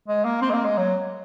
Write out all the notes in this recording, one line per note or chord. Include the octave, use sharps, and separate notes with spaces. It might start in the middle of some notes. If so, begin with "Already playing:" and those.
G#3
A#3
C4
G#3
A#3
G#3
F#3